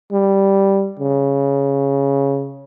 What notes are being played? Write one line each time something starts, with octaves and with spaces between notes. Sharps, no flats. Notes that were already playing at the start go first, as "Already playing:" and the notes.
G3
C#3